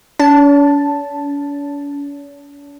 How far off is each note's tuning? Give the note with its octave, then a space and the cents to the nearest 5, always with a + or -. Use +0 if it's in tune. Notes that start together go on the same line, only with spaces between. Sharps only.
C#4 +45 A5 +0